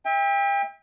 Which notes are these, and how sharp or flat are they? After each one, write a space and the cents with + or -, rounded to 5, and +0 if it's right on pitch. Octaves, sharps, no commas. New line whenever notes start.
E5 -20 G5 +35